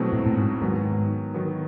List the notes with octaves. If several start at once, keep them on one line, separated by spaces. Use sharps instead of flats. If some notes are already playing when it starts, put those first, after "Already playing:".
Already playing: B2 F#3 A3 C4 E4
A2
A2
G#2
G#2 D#3 F#3 B3
D#3 F#3 B3